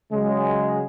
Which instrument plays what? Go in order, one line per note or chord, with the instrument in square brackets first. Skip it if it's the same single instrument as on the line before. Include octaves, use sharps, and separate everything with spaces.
[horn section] C#3 F#3 G#3